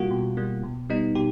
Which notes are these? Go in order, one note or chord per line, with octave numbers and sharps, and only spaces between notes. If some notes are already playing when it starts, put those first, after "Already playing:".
Already playing: B2 G3 A#3 F4 F#4
B2
G3 A#3
B2
G3 B3 D#4
B2 G4